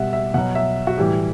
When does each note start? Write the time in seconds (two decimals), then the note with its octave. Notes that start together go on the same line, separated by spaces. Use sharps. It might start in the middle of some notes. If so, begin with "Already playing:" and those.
Already playing: B2 G3 E5 F#5
0.13 E5
0.34 B2 F#3 F#5
0.55 E5
0.87 F#4
0.97 A2 E3 G3 G4